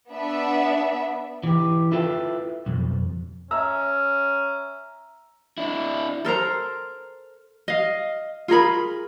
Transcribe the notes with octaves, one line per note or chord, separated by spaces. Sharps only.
B3 D4 E5
E3 G4
E4 F4 A4 B4 G5
B1 F2
C#4 E5 A#5 E6
D4 E4
A4 A#4 C5 A#5
D#5 F5
F4 G#4 A#4 B5